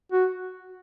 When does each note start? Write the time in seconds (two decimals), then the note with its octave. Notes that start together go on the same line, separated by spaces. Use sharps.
0.12 F#4